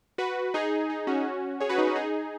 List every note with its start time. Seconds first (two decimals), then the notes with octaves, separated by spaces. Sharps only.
0.18 F#4 B4
0.54 D#4 G#4
0.90 D#4
1.07 C#4 F#4
1.60 G#4 C#5
1.69 F#4 B4
1.78 D#4 G#4
1.87 C#4 F#4
1.96 D#4 G#4